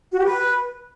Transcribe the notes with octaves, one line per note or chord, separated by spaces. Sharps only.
F#4
G4
B4